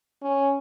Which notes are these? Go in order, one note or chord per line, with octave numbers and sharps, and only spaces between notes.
C#4